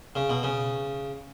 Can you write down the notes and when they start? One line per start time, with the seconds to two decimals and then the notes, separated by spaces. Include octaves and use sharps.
0.16 C#3
0.30 B2
0.43 C#3